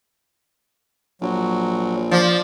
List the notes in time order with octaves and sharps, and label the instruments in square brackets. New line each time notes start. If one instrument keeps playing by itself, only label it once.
[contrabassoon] A#1 [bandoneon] F#3
[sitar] F3 [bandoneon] D5